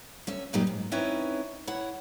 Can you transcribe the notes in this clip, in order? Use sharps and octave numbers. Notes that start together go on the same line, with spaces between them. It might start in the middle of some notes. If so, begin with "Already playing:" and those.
D2 C#4 E5
G2 A#2 F#3 A#3 D#4 G4
G#2
C4 C#4 D#4 E4 B4 C#5
E4 C#5 F#5